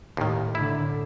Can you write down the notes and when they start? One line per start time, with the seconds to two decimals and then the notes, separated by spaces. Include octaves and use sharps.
0.17 D#2 A2 D#3
0.55 A2 D3 E4